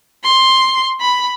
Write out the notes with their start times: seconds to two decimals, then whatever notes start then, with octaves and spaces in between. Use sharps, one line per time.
0.24 C6
1.01 B5